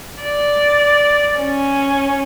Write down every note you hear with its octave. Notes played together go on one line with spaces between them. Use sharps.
D5
C#4